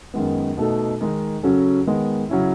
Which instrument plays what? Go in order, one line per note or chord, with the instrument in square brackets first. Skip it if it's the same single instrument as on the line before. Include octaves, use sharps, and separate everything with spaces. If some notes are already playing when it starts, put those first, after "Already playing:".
[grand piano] F#2 D#3 G#3 B3
B2 A3 D#4 F#4 A4
D#3 G#3 D#4
C#3 F#3 C#4 F#4 A4
D#3 G#3 B3
C#3 F#3 C#4 E4